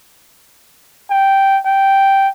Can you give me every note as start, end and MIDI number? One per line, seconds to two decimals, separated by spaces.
1.11 1.59 79
1.66 2.29 79